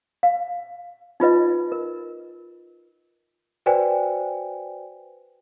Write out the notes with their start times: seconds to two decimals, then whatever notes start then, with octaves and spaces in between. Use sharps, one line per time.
0.23 F5
1.20 D#4 F4 B4 D#5
1.72 A#4
3.66 F#4 B4 C5 D5 G5 G#5